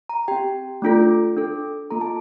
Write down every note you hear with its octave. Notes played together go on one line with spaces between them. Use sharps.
A#5
C4 G4 G5
A3 D4 F4 A4
D4 A4
A#3 F4 A4 A#5
A5